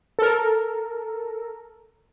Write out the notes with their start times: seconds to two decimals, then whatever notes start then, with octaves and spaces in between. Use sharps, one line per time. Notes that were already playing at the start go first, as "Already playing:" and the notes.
0.19 A4 A#4